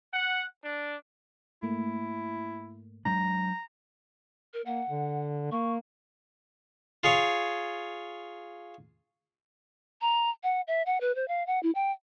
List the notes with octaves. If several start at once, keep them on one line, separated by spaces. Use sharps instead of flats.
F#5
D4
G#2 A3 A#3 E4
F#3 G#3 D4 A#5 G6
A#4
A#3 F#5
D3
A#3 C#6
F4 G#4 C#5 F5
A#5
F#5
E5
F#5
B4
C5
F5
F#5
E4
G5